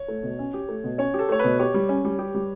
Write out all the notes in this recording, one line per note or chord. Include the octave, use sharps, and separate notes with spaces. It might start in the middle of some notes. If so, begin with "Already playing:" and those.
Already playing: C#5
A3
B2
C#4
G4
A3
B2
C#4 C#5
G4 A4
A3 C#5
B2 B4
G4 C#5
G3
C#4
G3
G4
G3